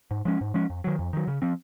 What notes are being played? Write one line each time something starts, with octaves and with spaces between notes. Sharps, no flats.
G#2
F3 G#3 C#4
G#2
F3 G#3 C#4
F2
D#3 F#3
F2
D#3 F#3
C#3
F3 C4